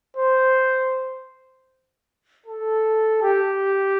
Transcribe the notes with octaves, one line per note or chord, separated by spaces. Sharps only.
C5
A4
G4